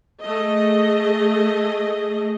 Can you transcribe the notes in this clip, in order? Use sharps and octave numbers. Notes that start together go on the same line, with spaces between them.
A3 G#4 D#5